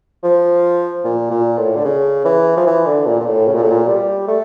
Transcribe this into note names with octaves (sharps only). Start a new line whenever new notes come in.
F3
A#2
A#2
A2
D3
C#3
E3
F3
E3
D3
A#2
A#2
A2
C#3
A#2
A2
A#2
G3
A3